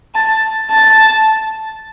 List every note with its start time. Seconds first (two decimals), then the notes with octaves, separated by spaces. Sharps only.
0.15 A5
0.70 A5